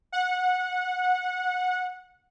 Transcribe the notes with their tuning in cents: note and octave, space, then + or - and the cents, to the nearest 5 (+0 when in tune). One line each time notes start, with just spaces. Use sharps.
F#5 -20